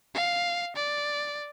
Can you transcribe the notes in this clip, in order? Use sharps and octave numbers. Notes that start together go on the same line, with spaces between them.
F5
D5